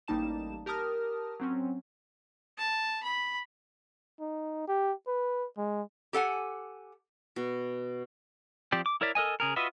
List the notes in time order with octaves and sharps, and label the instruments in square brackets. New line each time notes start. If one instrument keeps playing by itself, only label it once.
[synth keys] A1 G3 A#3 D#4 A5 E7
G4 A#4 A5 D#6 F6
F#3 C4 C#4
[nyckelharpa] A5
B5
[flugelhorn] D#4
G4
B4
G#3
[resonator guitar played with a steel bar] G4 A4 F#5 G#5
[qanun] B2
[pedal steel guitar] F3 C4 G4 D5
D6
E4 A#4 C#5 D5 E5
A4 A#4 D#5 G#5
C#3 G#4 A#4
F4 F#4 B4 D#5 E5